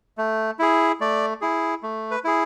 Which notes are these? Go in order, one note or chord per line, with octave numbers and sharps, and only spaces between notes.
A3
E4 G#4
A3 D5
E4 G#4
A3
B4
E4 G#4